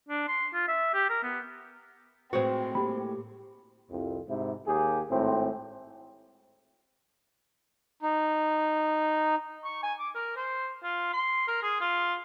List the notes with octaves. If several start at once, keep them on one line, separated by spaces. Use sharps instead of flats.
D4
C6
F4
E5
G4
A#4
B3
A2 G#3 C4 F#4 B4 C5
A#3 G4 B5
C2 F2
G#2 C3 E4
D#2 G4 G#4
G#1 A2 C4
D#4
C#6
G#5
D6
A#4
C5
F4
C6
A#4
G#4
F4